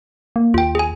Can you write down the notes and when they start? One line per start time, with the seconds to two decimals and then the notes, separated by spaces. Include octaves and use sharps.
0.36 A#3
0.54 D#2 F4 G5
0.75 G#4 G#5